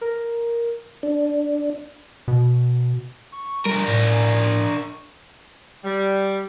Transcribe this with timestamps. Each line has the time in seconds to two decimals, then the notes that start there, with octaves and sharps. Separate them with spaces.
0.01 A#4
1.03 D4
2.28 B2
3.32 C#6
3.66 G3 D4 A#4
3.88 A2
4.68 C#6
5.85 G3